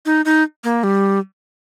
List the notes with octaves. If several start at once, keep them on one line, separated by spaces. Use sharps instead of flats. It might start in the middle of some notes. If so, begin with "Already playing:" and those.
D#4
D#4
A#3
G3